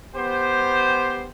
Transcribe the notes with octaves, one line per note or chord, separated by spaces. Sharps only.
B3 G4 C5